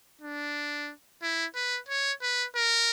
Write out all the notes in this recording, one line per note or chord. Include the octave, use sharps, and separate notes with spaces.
D4
E4
B4
C#5
B4
A#4